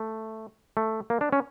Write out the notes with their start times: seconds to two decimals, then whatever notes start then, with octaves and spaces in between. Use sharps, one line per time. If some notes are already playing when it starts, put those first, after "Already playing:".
Already playing: A3
0.77 A3
1.10 A#3
1.21 D4
1.33 C#4